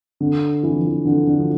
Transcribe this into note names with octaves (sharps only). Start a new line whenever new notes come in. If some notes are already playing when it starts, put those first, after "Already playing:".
D3
E3
F3
E3
D3
D3
F3